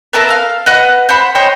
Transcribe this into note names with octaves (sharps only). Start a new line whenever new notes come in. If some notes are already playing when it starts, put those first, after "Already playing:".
B3 A4 A#4 E5
F5
B4 D#5 F#5
C5 F#5 B5
C5 C#5 D#5 G5